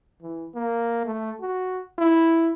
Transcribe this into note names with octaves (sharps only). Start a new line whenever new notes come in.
E3
A#3
A3
F#4
E4